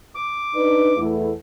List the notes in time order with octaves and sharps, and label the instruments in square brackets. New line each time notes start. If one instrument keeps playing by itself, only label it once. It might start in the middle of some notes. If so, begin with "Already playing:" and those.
[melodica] D6
[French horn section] D4 D#4 B4
E2 A3 E4